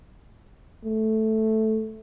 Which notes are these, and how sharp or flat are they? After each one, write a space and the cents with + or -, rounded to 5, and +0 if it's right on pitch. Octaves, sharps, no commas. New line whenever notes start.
A3 -5